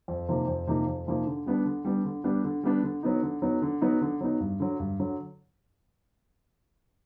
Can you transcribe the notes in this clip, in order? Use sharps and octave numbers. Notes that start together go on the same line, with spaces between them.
F2
C3 F3 A#3 D#4
F2
C3 F3 A#3 D#4
F2
C3 F3 A#3 D#4
D3
G3 B3 D4
D3
G3 B3 D4
D3
G3 B3 D4
D3
G3 B3 D4
D3
F#3 B3 D#4
D3
F#3 B3 D#4
D3
F#3 B3 D#4
D3
F#3 B3 D#4
G2
D3 F#3
G2
D3 F#3